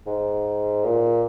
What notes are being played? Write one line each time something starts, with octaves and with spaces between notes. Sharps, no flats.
G#2
A#2